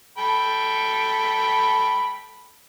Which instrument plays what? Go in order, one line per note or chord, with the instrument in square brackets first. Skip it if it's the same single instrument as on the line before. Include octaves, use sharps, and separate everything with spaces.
[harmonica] A4 G5 B5